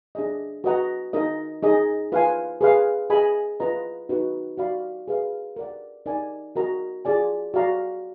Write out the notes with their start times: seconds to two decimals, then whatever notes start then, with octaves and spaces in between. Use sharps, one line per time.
0.15 D4 G#4 D#5
0.64 F#4 B4 D#5 F#5 A#5
1.13 D#4 A#4 D#5
1.62 D#4 G#4 D#5
2.12 F4 B4 F5 G#5
2.61 G#4 B4 F5
3.10 G#4 D#5 G#5 B5
3.60 F4 B4 D#5 A#5
4.09 D#4 F#4 B4
4.58 F#4 D5 F5 B5
5.08 G#4 B4 F5
5.56 A#4 D5 F#5
6.06 D#4 A#4 D5 G#5
6.56 F#4 A#4 D#5 A#5
7.05 F4 G#4 D5 G#5
7.54 F#4 D5 F5 A#5